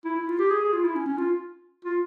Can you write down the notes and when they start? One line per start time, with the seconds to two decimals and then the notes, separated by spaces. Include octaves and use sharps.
0.05 E4
0.16 E4
0.28 F4
0.39 G4
0.50 G#4
0.61 G#4
0.73 F4
0.84 E4
0.95 C#4
1.06 C#4
1.18 F4
1.85 F4